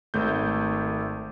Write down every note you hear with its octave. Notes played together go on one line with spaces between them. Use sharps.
G#1 A3 G6